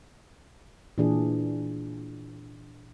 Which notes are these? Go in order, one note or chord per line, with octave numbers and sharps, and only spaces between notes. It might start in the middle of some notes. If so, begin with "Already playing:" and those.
A#2 E3 D4 G#4